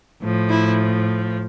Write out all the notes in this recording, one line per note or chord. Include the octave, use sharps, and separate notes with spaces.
A2 F3
E4